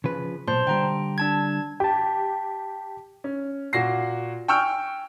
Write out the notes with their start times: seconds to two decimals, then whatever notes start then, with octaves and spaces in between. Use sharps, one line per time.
0.04 C#3 F3 B4
0.48 B1 F#2 A#2 C5 A5 C6
0.67 D3 G3 G5 A#5
1.18 D4 A5 G#6
1.80 G4 G5 A5
3.24 C#4
3.73 A#2 F#4 A#6 C7
4.48 G5 G#5 C#6 E6 F6 G6